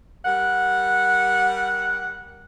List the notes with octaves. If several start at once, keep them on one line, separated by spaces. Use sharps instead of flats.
G3 A#4 F#5